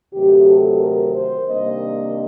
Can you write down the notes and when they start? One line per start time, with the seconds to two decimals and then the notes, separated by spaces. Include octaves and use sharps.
0.13 D2 C3 D#3 F#3 A3 G4
0.47 A4
0.80 A#4
1.14 C5
1.47 C3 D#3 G3 A#3 D4 D#5